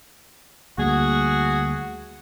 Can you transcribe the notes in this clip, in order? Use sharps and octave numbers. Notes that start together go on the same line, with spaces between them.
D2 G3 A#3 F#4 G#4